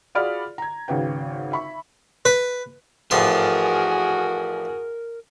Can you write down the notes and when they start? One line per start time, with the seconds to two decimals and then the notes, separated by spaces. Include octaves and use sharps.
0.15 F4 F#4 G#4 D5 B5 F6
0.58 A#5 G#6
0.88 G#1 C#3 F#4 B4 G5
1.52 E5 B5 C#6
2.25 B4
3.11 A1 F3 F#4 G#4 A#4 G#5 C6